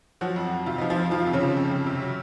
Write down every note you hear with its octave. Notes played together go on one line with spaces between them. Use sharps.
F3 F#3 F#4
F2
F2
C3 F4
F3 D#4
F3 F4
F2
F2 F3 F4
C3
C#3 C#4
F3
F2
F2
C3
F#3